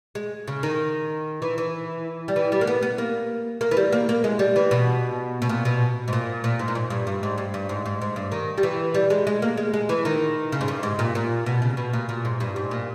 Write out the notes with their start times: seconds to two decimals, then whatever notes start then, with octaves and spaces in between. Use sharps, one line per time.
0.15 G#3
0.48 C#3
0.63 D#3
1.42 E3
1.58 E3
2.28 G3
2.36 E3
2.52 G3
2.61 A#3
2.67 B3
2.83 B3
2.98 A#3
3.61 A#3
3.71 E3
3.77 G3
3.92 A#3
4.09 A#3
4.24 G#3
4.39 G3
4.56 E3
4.71 B2
5.42 B2
5.49 A#2
5.65 B2
6.08 G#2
6.13 A#2
6.44 A#2
6.59 G#2
6.68 A#2
6.75 G#2
6.90 G2
7.07 G2
7.23 G#2
7.38 G2
7.54 G2
7.69 G#2
7.86 G#2
8.01 G#2
8.16 G2
8.32 D#3
8.58 G3
8.63 E3
8.94 G3
9.10 G#3
9.27 G#3
9.42 A#3
9.57 G#3
9.74 G#3
9.89 E3
10.05 D#3
10.52 C#3
10.61 G#2
10.68 G2
10.83 G#2
10.99 A#2
11.15 A#2
11.46 B2
11.62 C#3
11.77 B2
11.93 A#2
12.09 A#2
12.25 G#2
12.40 G2
12.56 G#2
12.71 A#2